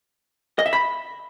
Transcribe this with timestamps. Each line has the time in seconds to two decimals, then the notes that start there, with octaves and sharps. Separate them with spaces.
0.59 D#5
0.66 E5
0.73 B5